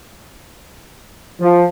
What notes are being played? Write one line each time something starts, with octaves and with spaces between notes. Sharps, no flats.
F3